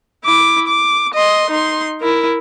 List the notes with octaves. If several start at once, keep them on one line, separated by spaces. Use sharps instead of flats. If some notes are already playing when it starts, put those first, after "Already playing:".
E4 D6
D6
D#5 C6
D#4 C6
E4 A#4